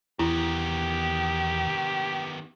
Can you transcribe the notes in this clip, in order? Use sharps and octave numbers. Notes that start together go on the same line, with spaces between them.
E2 D#3 B3 E4 G4